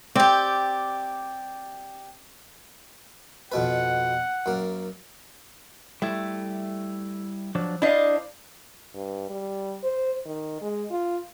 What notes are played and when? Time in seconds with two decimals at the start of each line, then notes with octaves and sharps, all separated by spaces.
0.16 C4 G4 D5
3.52 F2 B2 B4 F#5
4.46 F#2 A#3
6.02 G3 A3 E4
7.55 F3 F#3 D4
7.82 D4 E4 C5 D#5 F5
8.95 G2
9.30 G3
9.83 C5
10.26 D#3
10.62 G#3
10.91 F4